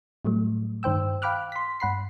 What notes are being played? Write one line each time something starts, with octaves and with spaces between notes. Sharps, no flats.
A2 F#3 G3 A3
G2 D#3 C5 G5 E6
F5 G5 B5 D6 F6 F#6
C6 B6
G2 F#5 B5 C7